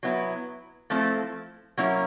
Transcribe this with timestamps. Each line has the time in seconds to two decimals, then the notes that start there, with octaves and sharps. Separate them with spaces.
0.03 F#3 B3 E4
0.90 F3 A3 C4 E4
1.77 F#3 A#3 C#4 E4